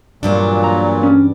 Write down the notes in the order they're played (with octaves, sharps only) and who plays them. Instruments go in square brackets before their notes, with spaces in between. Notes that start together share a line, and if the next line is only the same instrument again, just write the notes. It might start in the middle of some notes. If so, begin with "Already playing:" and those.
[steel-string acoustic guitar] E2 G2 D4 [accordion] A#2 F#3
[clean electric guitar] A#5
C#4